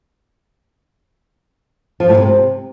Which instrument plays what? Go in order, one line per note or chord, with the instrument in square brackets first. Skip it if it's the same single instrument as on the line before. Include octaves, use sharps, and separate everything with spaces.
[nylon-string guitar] F3
A2
C3